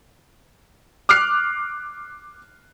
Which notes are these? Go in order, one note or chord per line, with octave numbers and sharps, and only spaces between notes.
D6 F6 F#6 C7